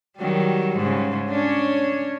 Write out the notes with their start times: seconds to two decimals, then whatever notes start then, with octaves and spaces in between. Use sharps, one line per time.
0.17 D#3 F#3 G3
0.77 G#2 C#3
1.29 C#4 D4 C#5